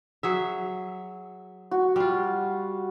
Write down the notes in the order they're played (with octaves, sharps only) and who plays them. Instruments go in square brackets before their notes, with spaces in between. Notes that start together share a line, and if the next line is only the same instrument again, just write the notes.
[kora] F#3 G#4 E5
[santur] F#4
[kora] G3 F4